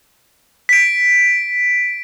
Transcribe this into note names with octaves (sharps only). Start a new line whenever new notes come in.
B6 D7